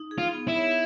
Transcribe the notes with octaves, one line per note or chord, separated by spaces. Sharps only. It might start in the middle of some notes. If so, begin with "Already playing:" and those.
Already playing: D#4
G#4
F4
B3
E4
C#5